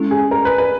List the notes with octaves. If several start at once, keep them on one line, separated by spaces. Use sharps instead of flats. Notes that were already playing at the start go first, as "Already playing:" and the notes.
Already playing: G#3 C#4 E4 A4
G#4
A#4
B4
B4